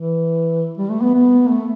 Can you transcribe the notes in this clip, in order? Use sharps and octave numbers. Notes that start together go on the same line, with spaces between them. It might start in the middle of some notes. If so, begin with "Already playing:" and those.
Already playing: E3
G3
A3
B3
B3
A3